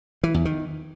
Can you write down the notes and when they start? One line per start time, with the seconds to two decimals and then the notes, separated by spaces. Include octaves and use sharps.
0.23 E3
0.34 E2
0.45 D#3